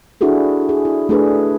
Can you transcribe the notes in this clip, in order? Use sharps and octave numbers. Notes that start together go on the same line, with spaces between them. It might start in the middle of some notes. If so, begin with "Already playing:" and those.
D4 E4 F#4 G#4 A4
G#4
E4
A3 D4 G#4 B4